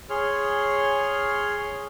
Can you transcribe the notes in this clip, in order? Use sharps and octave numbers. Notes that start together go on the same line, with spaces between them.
G#4 C#5 C6 F6